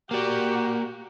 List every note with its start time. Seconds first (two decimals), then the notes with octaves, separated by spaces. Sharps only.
0.11 A#3 F#4 G4 D5